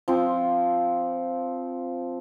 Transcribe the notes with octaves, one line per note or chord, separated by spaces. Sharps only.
F3 C4 F4